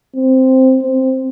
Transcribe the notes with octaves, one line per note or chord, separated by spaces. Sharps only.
C4
C4